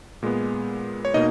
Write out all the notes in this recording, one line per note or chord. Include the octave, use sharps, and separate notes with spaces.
A#2 G#3 B3
C#5
B2 A#3 D#4 D#5